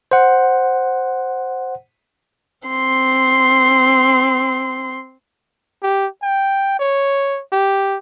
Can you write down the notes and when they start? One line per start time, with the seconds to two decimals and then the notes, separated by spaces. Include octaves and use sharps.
0.11 C5 F#5
2.68 C4 C6
5.83 G4
6.23 G5
6.80 C#5
7.53 G4